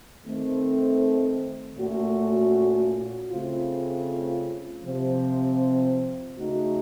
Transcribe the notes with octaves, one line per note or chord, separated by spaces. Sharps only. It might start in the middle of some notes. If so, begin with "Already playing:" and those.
D#3 A3 C4
A#2 A3 C#4 F#4
C#3 A3 C4 F4
C3 F3 C4
C#3 A3 D#4 F#4